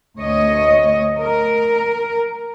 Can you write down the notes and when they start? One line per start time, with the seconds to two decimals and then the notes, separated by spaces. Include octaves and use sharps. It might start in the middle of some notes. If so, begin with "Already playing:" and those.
0.16 D2 C#5 D#5
1.18 A#4